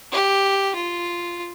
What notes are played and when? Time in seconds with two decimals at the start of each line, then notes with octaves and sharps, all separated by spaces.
0.12 G4
0.75 F4